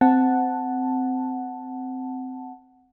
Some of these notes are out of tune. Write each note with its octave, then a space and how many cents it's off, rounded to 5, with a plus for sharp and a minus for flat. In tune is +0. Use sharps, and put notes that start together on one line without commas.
C4 -15 F#5 +0 A5 +0